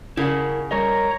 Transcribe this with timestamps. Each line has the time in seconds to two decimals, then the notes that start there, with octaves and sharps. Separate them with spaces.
0.17 C#3 E4 A#4 F#5
0.71 G3 A#4 C#5 D#5 A#5